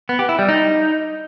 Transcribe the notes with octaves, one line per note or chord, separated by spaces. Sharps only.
B3
G4
E4
G3
D#4